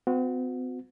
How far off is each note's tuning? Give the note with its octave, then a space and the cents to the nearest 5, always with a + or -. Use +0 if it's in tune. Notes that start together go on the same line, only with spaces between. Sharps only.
C4 -45 F#4 -30